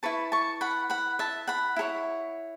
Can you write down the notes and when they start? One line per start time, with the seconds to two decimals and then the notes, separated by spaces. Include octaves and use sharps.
0.03 E4 B4 A5 C#6
0.32 A5 C#6
0.61 F#5 B5
0.90 F#5 B5
1.19 E5 A5
1.47 F#5 B5
1.76 E4 A4 C#5